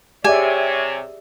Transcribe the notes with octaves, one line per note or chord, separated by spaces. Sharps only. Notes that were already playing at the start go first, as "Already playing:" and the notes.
C3 G4 G#4 C#5 D5 E5 G#5